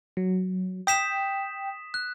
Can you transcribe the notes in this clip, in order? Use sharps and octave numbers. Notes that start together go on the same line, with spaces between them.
F#3
G5 D#6 B6 E7
F#6